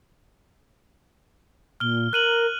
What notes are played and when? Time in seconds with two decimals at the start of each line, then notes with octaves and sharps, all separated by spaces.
1.80 A#2 F6 G7
2.13 A#4 F#6 D#7 F#7